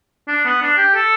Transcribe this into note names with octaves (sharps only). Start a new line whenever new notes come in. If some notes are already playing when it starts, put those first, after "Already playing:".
D4
B3
D4
G4
A4